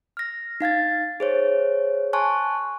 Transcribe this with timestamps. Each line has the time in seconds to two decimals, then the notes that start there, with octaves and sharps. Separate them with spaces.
0.17 F6 A#6
0.61 D#4 F5 G#6 A6
1.20 G#4 C5 C#5
2.13 G#5 A5 C6 C#6 F#6